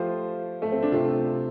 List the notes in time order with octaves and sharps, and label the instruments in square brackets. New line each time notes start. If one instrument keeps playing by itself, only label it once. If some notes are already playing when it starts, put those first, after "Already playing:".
Already playing: [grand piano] F3 A3 F4 C5 [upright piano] G4
[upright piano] A3
C4
D4
[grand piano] C3 A3 C4 [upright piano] F4